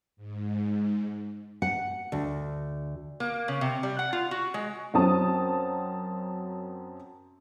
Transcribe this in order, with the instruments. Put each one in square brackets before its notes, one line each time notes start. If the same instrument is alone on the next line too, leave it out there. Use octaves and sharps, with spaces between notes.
[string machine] G#2
[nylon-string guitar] F#5
D2
[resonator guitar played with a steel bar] A#3
C#3
C3
G3
F#5
F4
F#4
G#3
[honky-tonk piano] F#2 F#3 C4 A5 D#6